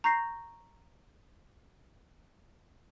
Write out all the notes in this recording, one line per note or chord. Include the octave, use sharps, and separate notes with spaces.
A#5 C#6 G6 A#6 C7